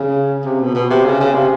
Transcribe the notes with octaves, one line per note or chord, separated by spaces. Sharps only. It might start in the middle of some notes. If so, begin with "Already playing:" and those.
Already playing: C#3
C3
B2
B2
C3
C#3
C#3
C3